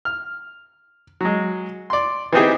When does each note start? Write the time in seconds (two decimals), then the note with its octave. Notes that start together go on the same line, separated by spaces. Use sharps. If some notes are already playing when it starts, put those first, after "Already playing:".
0.05 F6
1.21 F#3 G#3
1.90 D5 C6
2.33 E3 B3 C4 D#4 G4 G#4